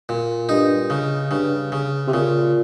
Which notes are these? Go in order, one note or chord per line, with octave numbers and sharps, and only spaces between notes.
A#2
G2 D#4
C#3
G2 C#3
C#3
C3
A#2 C#3